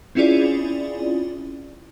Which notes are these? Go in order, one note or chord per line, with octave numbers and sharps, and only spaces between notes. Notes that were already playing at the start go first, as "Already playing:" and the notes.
C4 C#4 E4 F4 G#4 D5